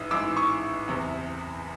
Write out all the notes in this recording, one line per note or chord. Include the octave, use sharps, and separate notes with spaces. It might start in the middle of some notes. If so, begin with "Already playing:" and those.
Already playing: A1 G#2 E3 D#6 E6
A1 G#2 E3 D6 E6
C#6 D#6
F#1 E2 C3